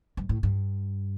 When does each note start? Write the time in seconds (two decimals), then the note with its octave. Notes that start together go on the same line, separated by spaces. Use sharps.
0.17 G2
0.29 A2
0.43 G2